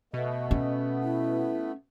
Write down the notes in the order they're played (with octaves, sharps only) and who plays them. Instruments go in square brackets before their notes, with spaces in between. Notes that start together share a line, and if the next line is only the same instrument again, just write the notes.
[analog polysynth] B2 [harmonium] A3 B3 [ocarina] D#5
[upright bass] C#4
[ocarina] E4